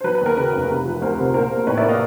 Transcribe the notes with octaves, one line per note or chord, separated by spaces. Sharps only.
C5
F#3 B4
B4
D#2 A#4
C#3 B4
F1
C3
F3
D2 A#4 C5
C3
A#1 A#4 C5
A#3
A2 B4 C#5
D5 E5
A#3
D#5 F5